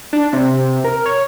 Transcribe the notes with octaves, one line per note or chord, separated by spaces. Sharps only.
D4
C3
A#4
C#5